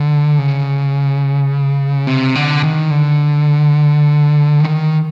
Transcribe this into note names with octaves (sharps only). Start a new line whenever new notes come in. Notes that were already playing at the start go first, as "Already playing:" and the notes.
Already playing: D3
C#3
C3
D3
D#3
D3
D#3